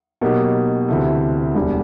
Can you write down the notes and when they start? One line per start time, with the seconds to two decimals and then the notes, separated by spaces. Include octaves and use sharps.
0.21 B2 F#3 A#3 D#4 G4
0.88 D2 C3 E3 A3
1.54 E1 D2 D3 G3